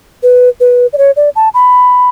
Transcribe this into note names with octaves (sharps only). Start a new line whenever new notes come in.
B4
B4
D5
C#5
D5
A5
B5